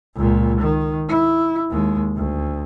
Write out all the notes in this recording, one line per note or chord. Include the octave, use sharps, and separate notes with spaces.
C#2 A#2
D#3
E4
D#2 G#3
D2